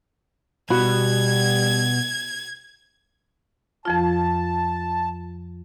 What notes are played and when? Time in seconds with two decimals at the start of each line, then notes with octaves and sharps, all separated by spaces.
0.70 B2 G3 F#4 B5 G#6
3.85 F2 F3 F4 A5